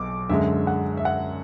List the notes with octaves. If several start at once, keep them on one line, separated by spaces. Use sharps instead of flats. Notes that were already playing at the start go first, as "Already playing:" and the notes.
Already playing: B1 D6
F#2 D3 G#3 E5
F#5
E5
F#5